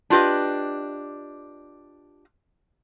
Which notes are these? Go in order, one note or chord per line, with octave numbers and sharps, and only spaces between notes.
D4 F4 G4 B4 D#5